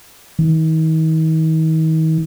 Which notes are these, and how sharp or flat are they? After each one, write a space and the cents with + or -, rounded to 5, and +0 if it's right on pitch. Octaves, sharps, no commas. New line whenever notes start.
D#3 +40